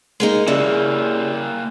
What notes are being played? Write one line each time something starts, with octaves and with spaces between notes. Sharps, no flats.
G#3 A#3 D#4
C#3 G3 A#3 E4